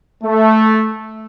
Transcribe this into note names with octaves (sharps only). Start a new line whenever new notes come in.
A3